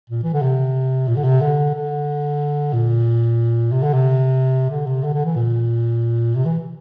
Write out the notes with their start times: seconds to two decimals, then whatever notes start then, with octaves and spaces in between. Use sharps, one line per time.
0.10 A#2
0.23 E3
0.34 D3
0.42 C3
1.08 A#2
1.16 D3
1.24 C3
1.41 D3
1.74 D3
2.73 A#2
3.72 C3
3.83 D3
3.94 C3
4.70 D3
4.87 C3
5.03 D3
5.14 D3
5.25 E3
5.36 A#2
6.35 C3
6.45 E3